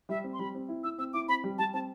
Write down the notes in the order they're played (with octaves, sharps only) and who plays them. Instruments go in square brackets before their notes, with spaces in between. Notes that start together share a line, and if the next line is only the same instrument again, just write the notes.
[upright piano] G3 [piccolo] E5
[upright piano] C4
[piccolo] C6
[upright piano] G3 [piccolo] B5
[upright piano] C4
E4
[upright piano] E4 [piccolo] E6
[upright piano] C4 [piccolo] E6
[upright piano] E4 [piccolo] D6
[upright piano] C4 [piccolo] B5
[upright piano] G3
[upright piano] G3 [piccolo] A5
[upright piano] C4 [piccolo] A5